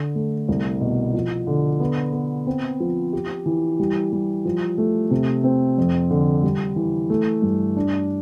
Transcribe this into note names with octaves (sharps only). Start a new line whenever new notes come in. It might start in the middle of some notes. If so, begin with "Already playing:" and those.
Already playing: D3
A3
C2
B2
F3
D3
B3
B3
C4
F3
G4
E3
G3
G3
F3
A3
C3
C4
F2
D3
G3
E3
A3
G2
D4